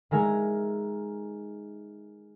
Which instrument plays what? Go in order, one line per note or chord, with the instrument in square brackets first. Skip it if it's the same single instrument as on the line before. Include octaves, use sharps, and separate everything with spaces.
[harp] D#3 G#3 A#4 E5 G#5 A#5